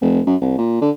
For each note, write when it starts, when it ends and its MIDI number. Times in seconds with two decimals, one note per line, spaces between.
0.01 0.20 29
0.26 0.35 42
0.41 0.53 36
0.58 0.78 46
0.81 0.90 50